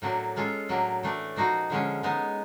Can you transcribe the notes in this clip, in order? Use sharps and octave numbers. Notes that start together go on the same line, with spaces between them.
A2 F#3 A#3 D4 F#4
G#3 C#4 F4 A4
A2 F#3 A#3 D4
A2 E3 A3 D4
A#2 F3 A#3 D#4 F#4
D3 F3 G#3 C#4
G#3 B3 D#4